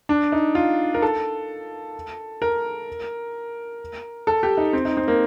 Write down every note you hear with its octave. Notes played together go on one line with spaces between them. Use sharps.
D4
D#4
F4
A#4
A4
A#4
A4
G4
D#4
C4
D#4
C4
A#3